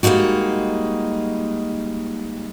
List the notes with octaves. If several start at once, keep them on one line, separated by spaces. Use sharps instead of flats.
G3 G#3 A#3 D#4 F#4